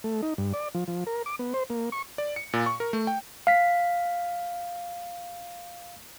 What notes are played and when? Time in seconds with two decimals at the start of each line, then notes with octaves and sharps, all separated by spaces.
0.04 A3
0.23 D#4
0.38 G2
0.53 D5
0.74 F3
0.88 F3
1.07 A#4
1.26 D6
1.39 B3
1.54 C5
1.70 A#3
1.92 C#6
2.18 D5
2.36 C#7
2.53 A#2
2.66 C#6
2.80 A#4
2.93 A3
3.07 G5
3.47 F5 B6